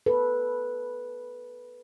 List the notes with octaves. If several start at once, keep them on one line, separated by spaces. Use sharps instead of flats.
A4 B4